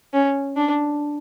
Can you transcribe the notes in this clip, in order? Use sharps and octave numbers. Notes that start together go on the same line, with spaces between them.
C#4
D4